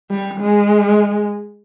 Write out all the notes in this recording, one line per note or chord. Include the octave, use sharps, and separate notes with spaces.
G3
G#3